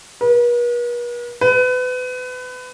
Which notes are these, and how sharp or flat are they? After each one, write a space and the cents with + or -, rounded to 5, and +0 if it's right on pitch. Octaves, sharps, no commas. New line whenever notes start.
B4 -45
B4 +30